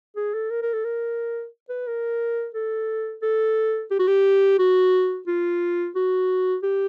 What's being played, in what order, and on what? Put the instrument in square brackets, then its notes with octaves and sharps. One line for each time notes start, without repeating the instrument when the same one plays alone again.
[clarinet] G#4
A4
A#4
A#4
A4
A#4
B4
A#4
A4
A4
G4
F#4
G4
F#4
F4
F#4
G4